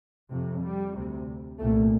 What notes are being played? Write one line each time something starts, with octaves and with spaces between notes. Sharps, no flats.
F2 C3
G3
D2 C3
C2 A#2 A3